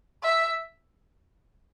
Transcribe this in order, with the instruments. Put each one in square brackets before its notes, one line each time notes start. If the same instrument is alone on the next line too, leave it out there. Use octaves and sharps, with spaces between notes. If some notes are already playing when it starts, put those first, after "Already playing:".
[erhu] E5